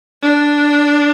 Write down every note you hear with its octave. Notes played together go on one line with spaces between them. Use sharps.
D4